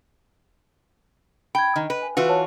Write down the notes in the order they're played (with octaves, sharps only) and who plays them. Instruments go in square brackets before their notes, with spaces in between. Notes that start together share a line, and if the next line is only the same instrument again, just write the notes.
[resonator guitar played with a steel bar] G5 [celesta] B5 G#6
[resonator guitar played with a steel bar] D#3 [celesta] D#5
[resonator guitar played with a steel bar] B4
[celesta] G#5
[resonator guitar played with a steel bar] E3 F4 F#4 [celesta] B4
[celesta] C#5 A5